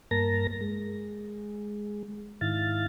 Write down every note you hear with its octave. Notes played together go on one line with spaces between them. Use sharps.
G2 A#3 A#4 A5 A#5 A#6
G#3
G#2 D#3 E4 F5 A6